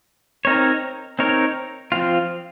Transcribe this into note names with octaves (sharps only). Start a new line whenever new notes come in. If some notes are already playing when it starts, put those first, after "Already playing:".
C4 D#4 A#4 C#5
C4 D#4 A#4 C#5
F3 C4 F4